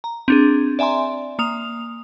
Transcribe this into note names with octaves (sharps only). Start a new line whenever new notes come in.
A#5
C4 D4 G#4
D5 E5 G#5 A#5 C6
A#3 D#6 F7